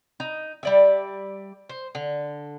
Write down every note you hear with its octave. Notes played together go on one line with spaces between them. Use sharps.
D#4
G3 D5 E5
C5
D3